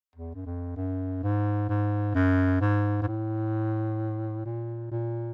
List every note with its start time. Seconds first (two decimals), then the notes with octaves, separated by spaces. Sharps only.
0.16 E2
0.35 F#2
0.46 F2
0.76 F#2
1.23 G#2
1.69 G#2
2.15 F#2
2.61 G#2
3.02 G#2
3.08 A2
4.46 A#2
4.91 A#2